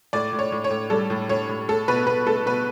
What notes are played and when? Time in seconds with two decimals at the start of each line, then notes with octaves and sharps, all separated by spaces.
0.13 A2 D5
0.33 A2
0.39 C#5
0.52 A2
0.64 C#5
0.70 A2
0.90 G3 A4
1.10 A2
1.29 A2 C#5
1.49 A2
1.68 A3 A4
1.88 B2 B4
2.07 B2 B4
2.26 A3 A4
2.46 B2 B4